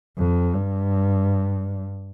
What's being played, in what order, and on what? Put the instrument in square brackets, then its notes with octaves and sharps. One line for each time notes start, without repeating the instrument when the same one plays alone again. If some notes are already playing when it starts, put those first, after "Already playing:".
[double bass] F2
G2